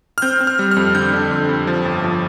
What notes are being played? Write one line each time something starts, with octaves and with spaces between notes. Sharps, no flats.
F6
C4 G6
C4
F6
G3
F6
F2
D3 G6
D3
F2
F2
F3
G1
F3